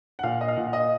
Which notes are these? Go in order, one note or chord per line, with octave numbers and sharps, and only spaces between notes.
F#5
A#2 F5
D#5
F5
A#2 F#5
F5
D#5